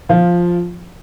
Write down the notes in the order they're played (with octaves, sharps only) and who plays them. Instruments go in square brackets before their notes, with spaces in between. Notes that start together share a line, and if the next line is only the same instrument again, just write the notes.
[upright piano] F3 F4